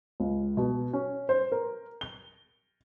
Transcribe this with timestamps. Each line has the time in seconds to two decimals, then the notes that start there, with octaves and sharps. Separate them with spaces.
0.20 C#2
0.57 B2
0.93 C#4
1.29 C5
1.52 A#4
2.01 G7